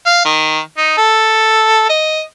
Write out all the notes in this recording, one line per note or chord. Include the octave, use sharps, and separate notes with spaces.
F5
D#3
D#4
A4
D#5